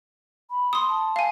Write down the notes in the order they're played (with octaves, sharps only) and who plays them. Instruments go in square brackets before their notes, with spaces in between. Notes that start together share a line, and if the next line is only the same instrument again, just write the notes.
[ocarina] B5
[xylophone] C6 D#6
[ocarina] A5
[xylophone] F5 G#5